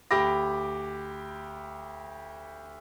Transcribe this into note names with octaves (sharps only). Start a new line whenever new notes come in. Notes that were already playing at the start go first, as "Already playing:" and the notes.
D2 G4 B5 D6 A#6